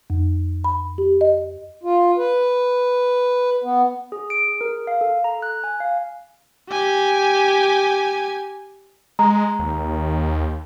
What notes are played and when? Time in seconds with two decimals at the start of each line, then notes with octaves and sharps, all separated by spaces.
0.10 F2
0.64 B5
0.98 G4
1.21 D#5
1.83 F4
2.18 B4
3.64 B3
4.12 G#4
4.30 D7
4.48 G#4
4.61 A#4
4.87 F5
5.01 A4
5.24 A#5
5.42 F#6
5.64 G#5
5.80 F5
6.69 G4 G#5
9.19 G#3 A#5
9.59 D#2